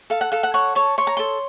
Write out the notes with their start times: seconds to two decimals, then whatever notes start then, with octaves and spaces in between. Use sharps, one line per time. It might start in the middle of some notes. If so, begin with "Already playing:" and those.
0.10 A4 F5
0.21 F#5
0.32 A4 F5
0.43 F#5
0.54 C#5 F#5
0.75 C#5 A5
0.98 C#5 C6
1.07 A#5
1.17 A4 C6